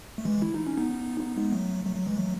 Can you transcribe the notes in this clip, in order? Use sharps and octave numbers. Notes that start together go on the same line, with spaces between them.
A3
E3 G#3
E4
D#4
C#4
B3 D#4
B3 D#4
G#3 B3
F#3 A3
F#3 A3
F#3
E3 G#3
F#3 A3